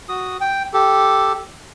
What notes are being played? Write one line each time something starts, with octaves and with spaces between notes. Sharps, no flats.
F#4 D#6
G5
G4 A4